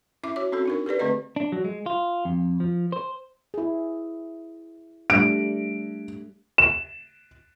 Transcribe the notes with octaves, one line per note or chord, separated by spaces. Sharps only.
C#4 E4 E5 D6
F#4 C#5 D6
C4 C#4 F#4 A4
D4 D#4 A#4
G4 A4 B4 D5
D3 A3 C4 G#4 B4 D#5
D4
F#3
G#3
F4
F2
F3
C5
E4 G#4
G3 A3 D4 D7
E7